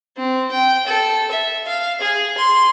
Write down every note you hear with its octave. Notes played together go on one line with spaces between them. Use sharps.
C4
G5
A4
E5
F5
G#4
C6